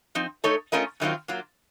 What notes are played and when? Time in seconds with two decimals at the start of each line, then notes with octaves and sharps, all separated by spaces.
0.15 F3 C4 D#4
0.44 A3 D#4 A4 C#5
0.72 A3 C#4 F4 A#4 D#5
1.00 F#2 D#3 F#3 C4 F4
1.28 F#3 A#3 F4